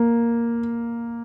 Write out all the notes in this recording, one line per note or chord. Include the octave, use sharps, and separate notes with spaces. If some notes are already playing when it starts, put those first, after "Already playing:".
Already playing: A#3